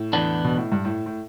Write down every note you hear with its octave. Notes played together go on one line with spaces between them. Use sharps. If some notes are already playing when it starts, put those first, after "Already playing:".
Already playing: A2
E2 D3 B3 D4
B2
A2
G2
A2
A2